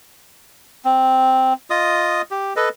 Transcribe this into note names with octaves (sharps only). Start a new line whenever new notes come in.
C4
F4 D#5 D#6
G4
A4 B4 D#5